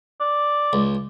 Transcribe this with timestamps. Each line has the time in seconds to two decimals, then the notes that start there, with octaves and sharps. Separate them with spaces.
0.21 D5
0.73 C#2